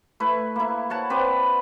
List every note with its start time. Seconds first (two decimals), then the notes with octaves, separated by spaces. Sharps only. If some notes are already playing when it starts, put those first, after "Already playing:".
0.20 A3 E4 B4
0.56 A#3 E4
0.90 C#5 F#5 A5
1.10 C4 B4 D5